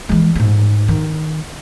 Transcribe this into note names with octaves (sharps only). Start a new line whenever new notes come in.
E3 G#3
G#2 A3
D#3